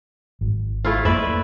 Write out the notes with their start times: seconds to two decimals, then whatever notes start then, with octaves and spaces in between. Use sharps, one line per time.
0.41 G#1
0.85 A3 E4 F4
1.05 F2 A#3 B4 D5 E5